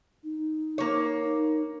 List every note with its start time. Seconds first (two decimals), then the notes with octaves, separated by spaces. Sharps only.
0.24 D#4
0.78 A#3 C#5
1.23 D#4